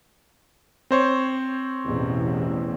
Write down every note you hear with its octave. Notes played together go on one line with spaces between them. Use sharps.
C4 C5 C#5
A1 E2 B2